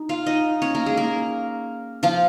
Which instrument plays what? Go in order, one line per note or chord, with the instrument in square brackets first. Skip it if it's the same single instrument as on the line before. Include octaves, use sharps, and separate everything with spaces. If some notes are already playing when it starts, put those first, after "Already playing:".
Already playing: [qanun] D#4
F4 F5
D#4 D#5
C#4 C#5
A#3 A#4
G#3 G#4
A#3 A#4
F3 F4